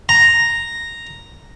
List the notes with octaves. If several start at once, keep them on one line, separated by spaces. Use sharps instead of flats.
A#5